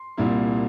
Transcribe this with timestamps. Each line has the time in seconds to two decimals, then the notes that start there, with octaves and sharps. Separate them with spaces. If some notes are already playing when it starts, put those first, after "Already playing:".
Already playing: C6
0.17 C2 A#2 G3 A#3 E4